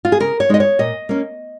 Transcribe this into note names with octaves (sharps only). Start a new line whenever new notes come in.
F4
G#4
C#3 A#4
C#5
G#3 D#4 D#5
C#5
A#2 D#5
A#3 C#4